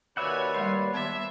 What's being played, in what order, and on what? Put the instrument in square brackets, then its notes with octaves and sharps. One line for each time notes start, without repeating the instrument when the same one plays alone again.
[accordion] D#2 B4 D5 [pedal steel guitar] F#4 E5 F#5 [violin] C#5 G#5
[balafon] G3 G#3 B5 [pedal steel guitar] C6
[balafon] D#3 B3 [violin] E5